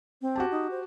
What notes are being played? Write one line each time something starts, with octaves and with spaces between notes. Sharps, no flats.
C4
F#4 G4 A5
D#4
C5